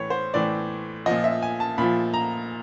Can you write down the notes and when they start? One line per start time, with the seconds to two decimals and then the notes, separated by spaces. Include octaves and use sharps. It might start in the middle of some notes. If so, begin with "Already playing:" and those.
Already playing: A2 E3 C#5
0.10 C5
0.34 A2 E3 D5
1.06 A#2 F3 D#5
1.24 E5
1.43 G#5
1.60 A5
1.78 A#2 F3 B5
2.14 A#5